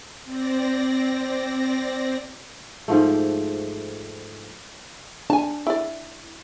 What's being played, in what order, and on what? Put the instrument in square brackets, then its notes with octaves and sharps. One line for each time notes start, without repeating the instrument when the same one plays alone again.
[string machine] C4 D5 A#6
[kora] G#2 F3 A3
[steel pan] D4 [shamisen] G#5 A5
[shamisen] E4 D5